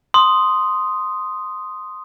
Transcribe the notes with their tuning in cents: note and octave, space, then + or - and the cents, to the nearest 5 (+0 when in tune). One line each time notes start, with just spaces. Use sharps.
C6 +0 D#6 +0